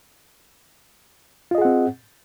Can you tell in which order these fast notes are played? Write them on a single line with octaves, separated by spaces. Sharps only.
F4 D#5 G#4 F#5 C4